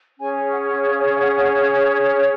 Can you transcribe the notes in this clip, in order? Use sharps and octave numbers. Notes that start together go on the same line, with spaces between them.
C#4 G#4 C#5 G#5
F#5
F5
F5
F#5